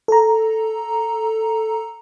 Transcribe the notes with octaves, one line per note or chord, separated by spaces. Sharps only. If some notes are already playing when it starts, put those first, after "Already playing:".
A4 A#5